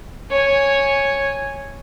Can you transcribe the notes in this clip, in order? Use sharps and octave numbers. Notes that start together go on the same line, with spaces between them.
C#5 G#5